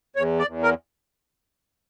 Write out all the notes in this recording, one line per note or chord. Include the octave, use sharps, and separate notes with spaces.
E2 C#5
D5
E2
A#4